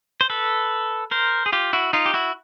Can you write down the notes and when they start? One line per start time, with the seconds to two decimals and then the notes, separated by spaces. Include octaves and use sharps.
0.21 C5
0.30 A4 B4
1.11 A#4 C5
1.46 G#4
1.52 F4 G4
1.73 E4 F#4
1.93 D#4 F4
2.06 G4
2.14 E4 F#4